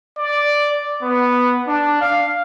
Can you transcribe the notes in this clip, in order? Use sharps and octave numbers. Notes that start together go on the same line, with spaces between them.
D5
B3
D4
F5